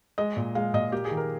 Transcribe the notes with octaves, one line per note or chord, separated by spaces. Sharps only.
G#3 D#5
A#2
G#3 F5
A#2 D#5
A#3 G4
G#4
D#3
A#4